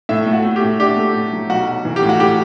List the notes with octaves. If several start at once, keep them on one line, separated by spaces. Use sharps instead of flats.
A2 E5
A3
F#4
A3
G4
A2
D4 G4
A3
A2
F#3
B1 F#4
B1
E3
G4
A2
F#4
A2 G4